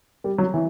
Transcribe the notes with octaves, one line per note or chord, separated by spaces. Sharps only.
G3
F#3
E3